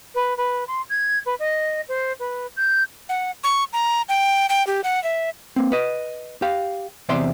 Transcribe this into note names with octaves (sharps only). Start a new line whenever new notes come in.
B4
B4
C6
G#6
B4
D#5
C5
B4
G6
F#5
C#6
A#5
G5
G5
G4
F#5
E5
A#3 C4
B4 D#5
G4 F5
E2 C3 C5 D5 E5 C6